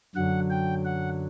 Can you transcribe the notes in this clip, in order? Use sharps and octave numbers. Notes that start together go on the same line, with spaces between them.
F#2 D3 F#3 F#5
G5
F#5